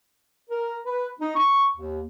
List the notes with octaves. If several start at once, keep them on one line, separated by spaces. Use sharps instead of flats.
A#4
B4
D#4
C#6
D#2